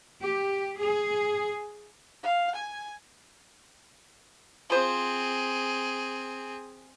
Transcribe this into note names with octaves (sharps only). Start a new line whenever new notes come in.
G4
G#4
F5
G#5
F3 C4 G#4 C5